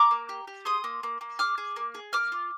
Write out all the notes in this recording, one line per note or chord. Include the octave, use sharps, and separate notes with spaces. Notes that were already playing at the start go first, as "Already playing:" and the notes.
Already playing: A#5 D6
A#3
G4
G4
G#4 C6 D#6
A#3
A#3
A#3
G#4 D6 F6
G#4
A#3
G#4
A#3 D6 F6
F4